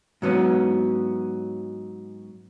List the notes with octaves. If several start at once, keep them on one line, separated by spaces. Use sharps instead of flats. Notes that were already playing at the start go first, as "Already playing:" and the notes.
G#2 F#3 B3 C#4